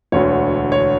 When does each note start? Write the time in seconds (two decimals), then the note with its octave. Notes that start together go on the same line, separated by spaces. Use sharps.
0.12 E1 D2 D3 C#5
0.72 C#5